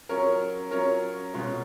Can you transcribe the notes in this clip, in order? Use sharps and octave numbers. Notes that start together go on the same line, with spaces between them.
F#3 C#4 F4 A#4 C#5
F#3 C#4 F4 A#4 C#5
B2 G#3 C#4 F4